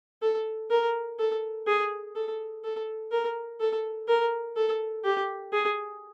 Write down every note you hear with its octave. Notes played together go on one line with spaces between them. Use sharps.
A4
A#4
A4
G#4
A4
A4
A#4
A4
A#4
A4
G4
G#4